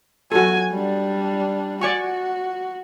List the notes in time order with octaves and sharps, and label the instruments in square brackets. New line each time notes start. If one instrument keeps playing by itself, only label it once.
[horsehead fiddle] F#3 G#5 [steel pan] F#4 A4
[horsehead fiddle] G3 D4
[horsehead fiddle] F#4 [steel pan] D5 G#5 C#6